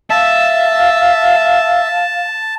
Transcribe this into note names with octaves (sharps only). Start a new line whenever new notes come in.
E5 F5 A5